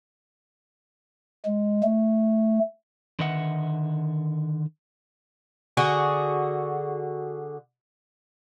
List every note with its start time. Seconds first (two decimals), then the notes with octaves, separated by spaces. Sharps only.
1.46 G#3
1.83 A3
3.19 D3 D#3 B4 D#5 E5 F#5
5.77 D3 F#4 G#4